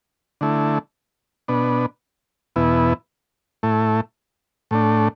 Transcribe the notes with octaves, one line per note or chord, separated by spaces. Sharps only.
D3 A3 E4
B2 B3 D4
E2 B2 B3 E4
A2 A3 E4
A2 A3 D4